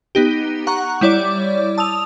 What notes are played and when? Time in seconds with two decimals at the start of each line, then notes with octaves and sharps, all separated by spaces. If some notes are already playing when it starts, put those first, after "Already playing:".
0.15 B3 D#4 G4
0.67 F#5 A#5 C#6 F#6
1.01 G3 E4 C#5 D5 D6
1.78 A5 D#6 E6 F7